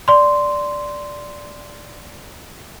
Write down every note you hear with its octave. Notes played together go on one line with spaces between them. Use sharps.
D5 C6